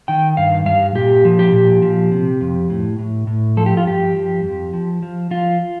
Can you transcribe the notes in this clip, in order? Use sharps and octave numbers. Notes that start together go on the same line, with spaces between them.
D#3 G5
G2 F5
G2 F5
A#2 G4
F3
G4
A#2
F3
C3
F2
A2
A2
A2
F3 A4
G4
F4
G2 G4
F3
F2
F3
F3
F3 F4